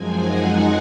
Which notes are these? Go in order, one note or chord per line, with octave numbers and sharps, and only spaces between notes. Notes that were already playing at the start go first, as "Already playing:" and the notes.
Already playing: F#2 F3 G#3 C4 D#4 G#5
F#5